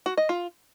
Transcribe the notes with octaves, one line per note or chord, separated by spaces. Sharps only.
F#4
D#5
F4